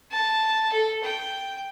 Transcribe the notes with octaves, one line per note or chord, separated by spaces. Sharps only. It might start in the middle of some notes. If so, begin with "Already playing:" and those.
A5
A4
G5